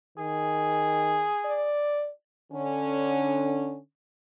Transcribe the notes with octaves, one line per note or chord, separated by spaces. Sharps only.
D#3 G#4
D5
D3 C#4